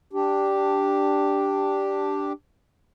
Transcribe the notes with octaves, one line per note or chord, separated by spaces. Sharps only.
D4 G4